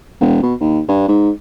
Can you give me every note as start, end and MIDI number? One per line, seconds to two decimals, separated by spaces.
0.20 0.41 28
0.43 0.54 47
0.60 0.81 39
0.88 1.06 43
1.08 1.30 44